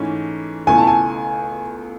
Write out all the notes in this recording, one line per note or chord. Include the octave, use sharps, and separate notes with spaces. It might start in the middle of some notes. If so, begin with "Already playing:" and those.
Already playing: G#2 E3 A3 C#4 E4
C#2 B2 A3 E4 G#5
A5
G#5